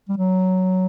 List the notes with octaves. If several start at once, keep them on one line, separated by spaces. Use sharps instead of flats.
G3
F#3